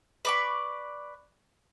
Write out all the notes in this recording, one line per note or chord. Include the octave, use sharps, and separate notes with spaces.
B4 D5 C#6